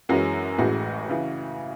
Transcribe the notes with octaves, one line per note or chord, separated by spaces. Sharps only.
F#2 E3 G#3 C#4 F#4
A1 A2 E3 G#3 F#4
C#3 E3